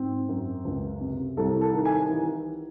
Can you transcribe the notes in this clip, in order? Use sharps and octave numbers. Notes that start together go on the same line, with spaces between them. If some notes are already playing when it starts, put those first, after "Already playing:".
Already playing: G#2 C4
F#2
C#2
C3
C2 A4
A4
D#3
G#5
E3